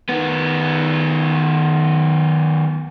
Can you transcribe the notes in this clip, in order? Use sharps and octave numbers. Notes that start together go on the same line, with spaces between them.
D#3 B3